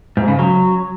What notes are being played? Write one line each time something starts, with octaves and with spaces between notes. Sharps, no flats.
G#2
C#3
F#3